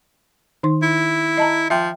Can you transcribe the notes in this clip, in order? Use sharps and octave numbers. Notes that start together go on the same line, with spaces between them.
D#3 D#4 C6
E4
D#5 A5 A#5
F3 E5 G5